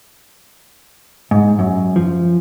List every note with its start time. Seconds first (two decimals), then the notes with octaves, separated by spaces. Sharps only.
1.31 G#2
1.59 F#2
1.96 F3